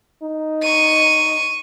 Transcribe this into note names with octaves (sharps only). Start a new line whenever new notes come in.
D#4
C#6 D#7